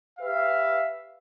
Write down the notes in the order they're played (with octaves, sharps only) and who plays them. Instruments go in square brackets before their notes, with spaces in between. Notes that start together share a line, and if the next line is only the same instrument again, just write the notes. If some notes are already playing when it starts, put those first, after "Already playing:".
[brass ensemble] G4 B4 E5 F5